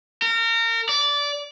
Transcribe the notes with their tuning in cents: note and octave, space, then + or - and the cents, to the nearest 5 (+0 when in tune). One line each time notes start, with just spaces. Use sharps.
A#4 -30
D5 -20